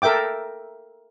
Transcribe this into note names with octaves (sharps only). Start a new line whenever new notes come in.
A4 A#4 E5 G5 D6